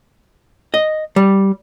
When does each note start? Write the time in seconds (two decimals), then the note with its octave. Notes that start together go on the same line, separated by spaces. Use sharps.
0.74 D#5
1.16 G3